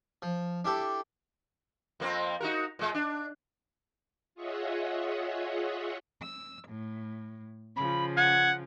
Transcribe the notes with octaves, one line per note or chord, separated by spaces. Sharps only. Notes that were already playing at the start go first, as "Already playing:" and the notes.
F3
D4 E4 G4 A4
F2 A#3 C4
D#4 F#4 A#4
A#2 G#3
D4
F4 G#4 C#5 D#5 E5 F#5
E6
A2
C#3 F3 B5
F#5 G#6